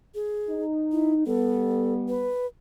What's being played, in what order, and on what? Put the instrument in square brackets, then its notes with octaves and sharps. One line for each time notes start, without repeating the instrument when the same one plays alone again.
[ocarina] G#4
[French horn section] D#4
[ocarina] E4
[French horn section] G3 B3 [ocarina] A4
[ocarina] B4